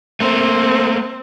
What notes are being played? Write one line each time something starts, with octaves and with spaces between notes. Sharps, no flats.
A3 A#3 C4